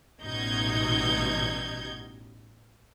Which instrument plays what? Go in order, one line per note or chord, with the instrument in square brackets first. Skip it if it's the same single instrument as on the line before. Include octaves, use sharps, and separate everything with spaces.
[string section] A1 B2 G3 D#4 G6 G#6